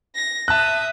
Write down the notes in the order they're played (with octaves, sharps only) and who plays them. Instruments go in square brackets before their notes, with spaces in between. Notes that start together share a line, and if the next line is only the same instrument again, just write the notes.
[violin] A#6
[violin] E5 D#6 [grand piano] A5 F#6